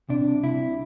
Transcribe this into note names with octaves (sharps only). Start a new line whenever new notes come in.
C3 D4
C2
C3 E4
C2